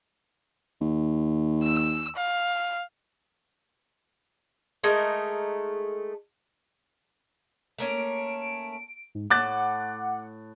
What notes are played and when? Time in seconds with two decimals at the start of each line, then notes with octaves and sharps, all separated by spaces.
0.81 D#2
1.63 E6
2.16 F5
4.84 G#3 A3 D#4 A#4
7.78 A3 A#3 C#4 D7
9.15 G#2
9.30 A2 F#5 D6 F#6 A6